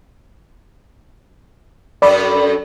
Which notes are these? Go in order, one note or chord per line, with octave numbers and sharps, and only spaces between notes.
F#2 D4 A4 D5 B5